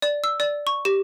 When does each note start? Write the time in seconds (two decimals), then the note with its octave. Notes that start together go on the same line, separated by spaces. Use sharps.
0.02 D5
0.24 E6
0.40 D5
0.67 C#6
0.85 G4